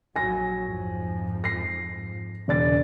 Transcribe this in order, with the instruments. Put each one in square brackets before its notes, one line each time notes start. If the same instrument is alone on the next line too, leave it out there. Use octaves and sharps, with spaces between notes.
[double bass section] A#1 F#3 [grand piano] G#5 A#6
[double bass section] F2 G#2 F3
[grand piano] A#6 C7
[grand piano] E1 D5 A6 [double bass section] C#3